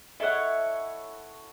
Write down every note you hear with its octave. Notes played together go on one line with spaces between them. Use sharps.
E4 A4 C#5 D#5 F#5